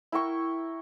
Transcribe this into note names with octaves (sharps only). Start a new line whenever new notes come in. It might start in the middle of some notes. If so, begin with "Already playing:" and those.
E4 A#4 G5 C#6